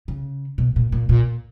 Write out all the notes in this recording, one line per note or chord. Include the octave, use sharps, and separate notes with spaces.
C#3
B2
A#2
A#2
A#2